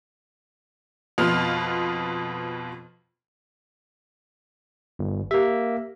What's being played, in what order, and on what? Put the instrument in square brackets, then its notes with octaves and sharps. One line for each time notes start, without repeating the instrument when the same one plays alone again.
[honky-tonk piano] F2 B2 B3 F4 F6
[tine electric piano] G1
[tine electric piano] A#3 E5 [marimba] G4